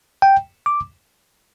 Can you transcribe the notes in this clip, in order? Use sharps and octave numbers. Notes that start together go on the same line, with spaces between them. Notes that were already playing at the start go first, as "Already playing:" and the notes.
G5
D6